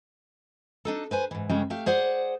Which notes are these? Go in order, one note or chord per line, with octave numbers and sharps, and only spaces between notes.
D4 D#4 A4
B4 C5 G#5
G#2 E3
D2 G2 C#3 G3 G#3 C#4
A3 G4 F5
G#4 C5 D5 F#5